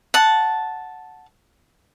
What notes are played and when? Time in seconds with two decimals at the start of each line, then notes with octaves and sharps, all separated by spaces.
0.14 F#5 A5